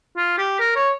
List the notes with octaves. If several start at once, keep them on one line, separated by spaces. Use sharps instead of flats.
F4
G4
A#4
C#5